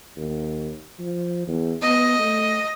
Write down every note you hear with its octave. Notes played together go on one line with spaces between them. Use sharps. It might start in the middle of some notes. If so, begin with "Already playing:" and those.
D#2
F3
E2
B3 D#5
A3